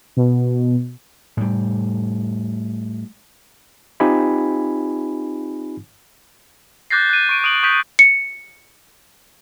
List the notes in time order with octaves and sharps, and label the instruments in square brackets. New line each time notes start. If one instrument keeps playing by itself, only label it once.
[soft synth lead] B2
[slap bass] A2 G3
[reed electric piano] C4 D#4 F4 G4 G#5 B5
[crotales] D6 F#6 G6 A6 A#6 C7
F#6 D#7
C#6 D7
D#6 D7 F#7
C#6 D#6 G6 B6
[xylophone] C#7